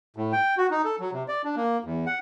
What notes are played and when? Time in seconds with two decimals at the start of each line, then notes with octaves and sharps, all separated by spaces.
0.16 A2
0.32 G5
0.58 F#4
0.71 D#4
0.85 A4
1.00 F#3
1.13 C3
1.28 D5
1.44 D4
1.56 A#3
1.84 E2
2.06 F#5